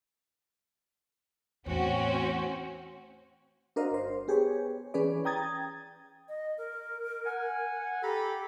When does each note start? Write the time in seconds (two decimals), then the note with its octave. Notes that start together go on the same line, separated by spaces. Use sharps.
1.66 E2 A2 C4 C#4 F#4
3.76 D4 F#4 A#4 C5 D#5 F5
3.91 G1 C5
4.28 B3 G4 G#4 B4 C#5
4.94 E3 C#4 G#4 B4 D5
5.25 G5 A#5 D#6 G#6 A6
6.28 D#5
6.58 A#4
7.26 F#5 G#5
8.02 G4 A4 A#5 B5